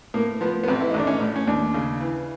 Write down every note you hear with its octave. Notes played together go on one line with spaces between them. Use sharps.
A2 A#3
F3 B3
B3
A1 C4
E4
D#4
A1 D4
C#4
A2
C#4
D#2 D4
C#3
E3